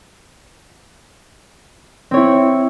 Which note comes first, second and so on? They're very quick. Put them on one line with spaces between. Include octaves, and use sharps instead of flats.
C4 C#5 E4